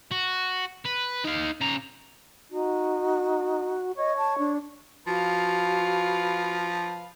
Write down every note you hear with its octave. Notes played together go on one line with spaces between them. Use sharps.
F#4
B4
D#4 F5
C#3 A#5
D#4 F#4
C#5 D#5
A5
D4
F3 F#4 B4 F5